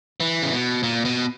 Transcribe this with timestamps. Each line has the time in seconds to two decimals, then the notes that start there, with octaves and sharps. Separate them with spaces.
0.20 E3
0.42 C#3
0.52 B2
0.83 A#2
1.05 B2